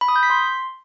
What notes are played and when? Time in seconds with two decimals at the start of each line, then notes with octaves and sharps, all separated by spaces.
0.01 B5
0.08 D#6
0.16 G6
0.23 B6
0.30 C6